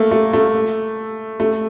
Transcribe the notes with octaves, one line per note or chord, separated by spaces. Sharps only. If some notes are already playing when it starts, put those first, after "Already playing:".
Already playing: A3 A#3
A3
A3
A3